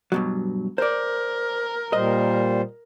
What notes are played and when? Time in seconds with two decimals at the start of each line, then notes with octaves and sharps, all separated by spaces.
0.12 G2 B2 F#3
0.78 A#4 C5 D5
1.93 A#2 G3 C5 D#5